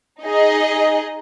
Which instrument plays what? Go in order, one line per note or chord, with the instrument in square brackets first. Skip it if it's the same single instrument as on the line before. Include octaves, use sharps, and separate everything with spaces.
[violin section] D#4 G#4 D#5